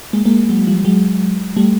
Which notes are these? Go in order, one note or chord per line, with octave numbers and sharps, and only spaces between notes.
G#3 A#3
G#3 A#3
F#3 G#3
F3 G3
F#3 G#3
G3 A3